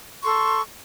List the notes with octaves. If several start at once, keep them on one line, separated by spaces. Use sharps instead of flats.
A4 C6 C#6